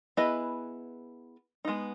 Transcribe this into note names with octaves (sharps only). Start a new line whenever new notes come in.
B3 E4 G#4 B4 D#5
G#3 B3 D#4